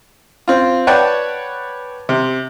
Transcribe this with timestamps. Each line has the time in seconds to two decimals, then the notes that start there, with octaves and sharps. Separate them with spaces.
0.48 C4 F4
0.87 B4 C#5 D5 F#5 G5 A5
2.09 C3